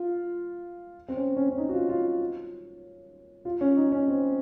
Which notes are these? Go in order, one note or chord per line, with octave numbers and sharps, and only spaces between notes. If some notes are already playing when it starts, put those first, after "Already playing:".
Already playing: F4
C4
C#4
C#4
C#4
D#4
F#4
F4
F4
F4
C#4
D#4
C#4
C4